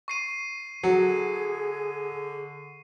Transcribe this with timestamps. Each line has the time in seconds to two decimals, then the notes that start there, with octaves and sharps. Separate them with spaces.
0.08 C#6 C7 D#7
0.84 D3 F#3 G#4